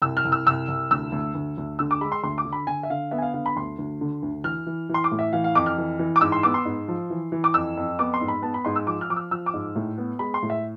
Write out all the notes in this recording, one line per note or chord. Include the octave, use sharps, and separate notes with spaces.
C2 E6
F6
C2
E6
C2 E6
C2
D2 E6
D2
D2
D2
D3 E6
D6
G#3 B5
C6
D2 C6
D6
D3
B5
D3 G#5
E5
D3 F5
B3 E5
G#5
F5
D3 F5
B5
D2 C6
D2
D3
D2
E3 F6
E3
E3
C6
D6
A2
E5
E3 F5
F5
F2 D6
F6
E3
E3
D6
G#2 E6
C6
B3 D6
C6
G#2
F3
E3
E3
D6
F2 E6
F2
B3 D6
C6
G#2
B5
B3 A5
B5
G#2 C6
E6
F3 D6
F6
F3 D6
E6
F3 E6
D6
G#2
A2
B3
G#3 B5
C6
A2
E5